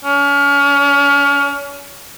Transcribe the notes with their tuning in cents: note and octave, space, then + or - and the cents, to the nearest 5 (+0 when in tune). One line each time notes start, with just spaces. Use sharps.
C#4 +35